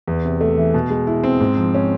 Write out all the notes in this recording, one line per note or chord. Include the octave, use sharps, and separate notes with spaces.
E2
C3
A3
E3
B2
G#3
E4
C4
G#2
F3
C#4